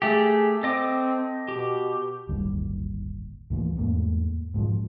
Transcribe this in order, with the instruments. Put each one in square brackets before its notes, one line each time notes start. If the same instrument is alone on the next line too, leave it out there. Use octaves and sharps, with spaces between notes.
[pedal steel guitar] A3 G4 [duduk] G#4
[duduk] C4 [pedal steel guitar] A4 D#5 D6
[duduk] B2 [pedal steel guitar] G4
[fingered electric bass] D1 G1 D#2 G3
D#2 A2 E3 A#3
E2 G#2 A3 A#3
G#2 B2 E3 F3